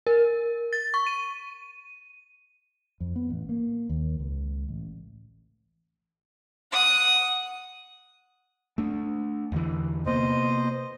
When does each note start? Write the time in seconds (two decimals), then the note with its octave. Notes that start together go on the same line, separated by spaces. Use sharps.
0.07 A#4
0.73 A6
0.94 C#6
1.07 D#7
3.00 F2
3.16 B3
3.30 A1
3.49 A#3
3.89 D#2
4.20 C#2
4.69 A1
6.72 F#5 D#6
8.78 A3 D4
9.52 E2 D3 E3
10.06 C3 A#3 B3 C5 D#5